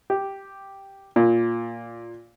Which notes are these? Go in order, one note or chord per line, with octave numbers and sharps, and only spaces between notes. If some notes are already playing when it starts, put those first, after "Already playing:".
G4
A#2